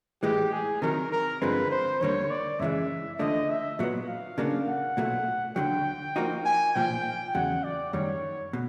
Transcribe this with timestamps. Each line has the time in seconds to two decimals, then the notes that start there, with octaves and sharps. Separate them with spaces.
0.23 A2 E3 G#3 G4
0.53 G#4
0.82 C3 D#3 F#3 A#4
1.12 A#4
1.42 G2 D3 F3 G#3 C4 B4
1.71 C5
2.01 D#2 D3 G3 A#3 C#5
2.30 D5
2.59 F#2 C#3 E3 G#3 E5
3.19 D#2 D3 F3 A3 D4 D#5
3.49 E5
3.79 A#2 F#3 B3
4.08 F5
4.38 C#3 F#3 A#3 D4
4.68 F#5
4.97 B1 A#2 F#3 A3
5.56 D2 D3 F#3 G5
6.16 F3 A#3 D#4 F#4
6.46 G#5
6.75 B1 A#2 F3 G5
7.34 E2 C#3 F#3 F#5
7.64 D5
7.93 F#2 D#3 G3 C#5
8.53 B2